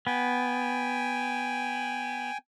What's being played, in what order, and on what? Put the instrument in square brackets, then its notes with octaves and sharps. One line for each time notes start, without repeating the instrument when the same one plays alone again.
[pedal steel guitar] B3 [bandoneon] G5 G#5